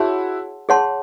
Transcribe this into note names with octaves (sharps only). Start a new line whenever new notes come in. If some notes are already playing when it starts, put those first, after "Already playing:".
Already playing: E4 F#4 G#4 C#5 F#5 A5 C6
G#4 C#5 F#5 A5 C6